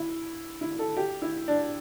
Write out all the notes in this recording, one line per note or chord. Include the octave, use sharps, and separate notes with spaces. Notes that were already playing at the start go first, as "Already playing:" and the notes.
Already playing: E4
E4
A4
G4
E4
D4